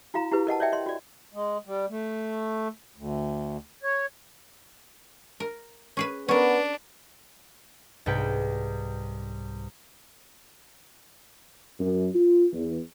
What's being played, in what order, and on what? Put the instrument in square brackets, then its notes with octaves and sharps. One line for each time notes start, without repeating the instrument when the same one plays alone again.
[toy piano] E4 F#4 F5 A#5
E4 G4 B4
A#4 D#5 F#5 A5
C#5 D5 E5 G5
C#5 D#5 C6
F#4 D5
[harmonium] G#3
G3
A3
D2
C#5
[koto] A#4
C#4 G#4 B4
[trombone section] B3 [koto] C#4 A#4 [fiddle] D4
[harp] C2 G#2 B4 G5
[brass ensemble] F#2
F4
E2